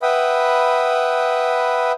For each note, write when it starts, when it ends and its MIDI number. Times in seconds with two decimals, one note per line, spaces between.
0.02 1.92 71
0.02 1.92 76
0.02 1.92 78
0.02 1.92 79
0.02 1.92 83
0.02 1.92 87